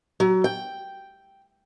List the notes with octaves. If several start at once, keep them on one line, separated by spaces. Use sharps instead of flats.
F#3
G5